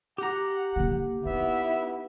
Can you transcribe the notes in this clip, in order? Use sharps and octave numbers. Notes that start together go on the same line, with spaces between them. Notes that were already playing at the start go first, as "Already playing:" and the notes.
G4 F#5 A#5
D3 A#3
B3 D#4 E4 E5